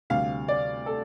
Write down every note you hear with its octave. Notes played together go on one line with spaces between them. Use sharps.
D2 C3 G3 F5
D5
A4